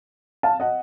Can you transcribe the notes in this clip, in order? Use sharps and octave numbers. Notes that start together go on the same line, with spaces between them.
F5 A5
D#5 F#5